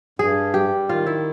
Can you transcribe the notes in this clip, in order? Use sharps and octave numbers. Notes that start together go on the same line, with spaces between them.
G2 G#4
G3 G4
D#3 F4
E4